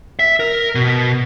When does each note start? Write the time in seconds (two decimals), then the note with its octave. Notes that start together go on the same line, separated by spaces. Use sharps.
0.19 E5
0.40 A#4
0.75 B2